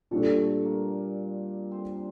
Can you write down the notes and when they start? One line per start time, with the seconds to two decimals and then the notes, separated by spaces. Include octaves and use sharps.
0.11 A#2 G3 A3 D4 A4
0.38 A3 A4
0.65 A#3 A#4
1.71 C4 C5